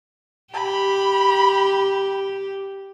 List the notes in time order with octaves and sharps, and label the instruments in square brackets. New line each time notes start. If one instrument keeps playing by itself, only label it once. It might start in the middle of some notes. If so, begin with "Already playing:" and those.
[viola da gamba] G4 [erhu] B5